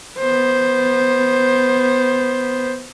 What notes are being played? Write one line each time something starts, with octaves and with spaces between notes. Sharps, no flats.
B3 C5